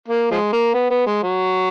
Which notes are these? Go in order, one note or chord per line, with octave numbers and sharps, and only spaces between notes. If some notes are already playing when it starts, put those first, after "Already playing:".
A#3
F3 G#3
A#3
B3
B3
G#3
F#3